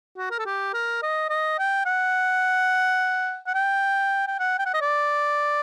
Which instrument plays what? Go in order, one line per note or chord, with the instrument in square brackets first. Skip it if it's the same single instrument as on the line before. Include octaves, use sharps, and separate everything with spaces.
[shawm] F#4
A#4
A4
G4
A#4
D#5
D#5
G5
F#5
F#5
G5
G5
F#5
G5
F#5
D#5
D5